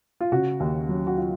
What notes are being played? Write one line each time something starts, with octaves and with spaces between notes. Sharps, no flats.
F4
C#3 F#4
D#2
F#3
F#4
F4